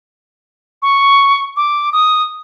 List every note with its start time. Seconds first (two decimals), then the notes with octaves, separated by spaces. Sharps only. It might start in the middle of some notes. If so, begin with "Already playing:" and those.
0.82 C#6
1.56 D6
1.92 D#6